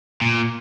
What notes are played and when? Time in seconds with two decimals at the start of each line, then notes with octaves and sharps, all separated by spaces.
0.22 A#2